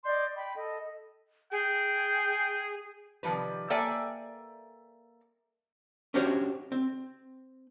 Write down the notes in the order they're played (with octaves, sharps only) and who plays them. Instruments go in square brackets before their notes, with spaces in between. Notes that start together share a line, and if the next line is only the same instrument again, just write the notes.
[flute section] D5 D#5 C6 G6
G5 B5
A4 D#5
[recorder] G#4 [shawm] G5
[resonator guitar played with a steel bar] C3 D#3 F3 G3 B4
A#3 A4 D5 E5 G5 G#5
[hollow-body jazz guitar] C#4 D4 F#4 G4 C5 C#5
C4